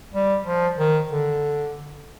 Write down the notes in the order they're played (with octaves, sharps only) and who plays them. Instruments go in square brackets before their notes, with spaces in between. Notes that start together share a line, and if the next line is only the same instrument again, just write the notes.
[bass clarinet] G3
F3
D#3
D3